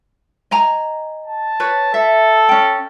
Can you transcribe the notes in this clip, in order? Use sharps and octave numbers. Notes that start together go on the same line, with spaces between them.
D#5 G#5 A#5
A5
B4 C#5
A4 E5
C#4 G5